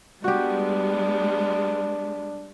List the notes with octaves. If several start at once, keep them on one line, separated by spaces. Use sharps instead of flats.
G3 G#3 B3 D4 F#4 G4